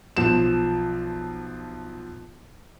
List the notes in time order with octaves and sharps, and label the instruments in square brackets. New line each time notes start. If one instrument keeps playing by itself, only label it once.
[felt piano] B1 F3 E7